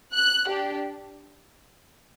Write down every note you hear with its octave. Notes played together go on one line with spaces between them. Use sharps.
F#6
D4 G4